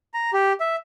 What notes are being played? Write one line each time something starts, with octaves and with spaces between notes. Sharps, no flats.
A#5
G4
E5